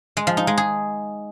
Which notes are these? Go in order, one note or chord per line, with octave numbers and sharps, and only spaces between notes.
G#3
F3
D#4
G#3
G#4